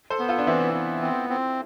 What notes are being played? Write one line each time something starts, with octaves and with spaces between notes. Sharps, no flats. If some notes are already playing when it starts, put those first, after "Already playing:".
A4 C5
B3
F4 A4
D4
E3 C4 E4
B3
C4
C4